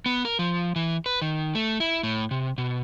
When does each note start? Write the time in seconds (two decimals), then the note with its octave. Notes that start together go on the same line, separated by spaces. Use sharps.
0.06 B3
0.25 A#4
0.39 F3
0.76 E3
1.06 B4
1.22 D#3
1.55 A3
1.80 E4
2.03 A2
2.31 C3
2.58 B2